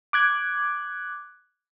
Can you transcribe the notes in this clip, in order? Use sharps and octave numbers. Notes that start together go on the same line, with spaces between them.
D6 F#6 G#6